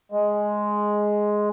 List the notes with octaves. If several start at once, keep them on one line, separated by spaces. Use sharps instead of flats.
G#3